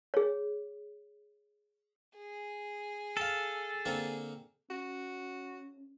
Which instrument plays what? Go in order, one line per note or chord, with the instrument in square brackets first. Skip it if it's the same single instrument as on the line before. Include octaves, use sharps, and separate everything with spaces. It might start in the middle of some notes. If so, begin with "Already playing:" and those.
[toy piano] G#4 C#5
[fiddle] G#4
[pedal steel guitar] A4 [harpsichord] F5 G5
[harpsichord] D3 A#3 C4
[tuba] C#4 [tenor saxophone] F#4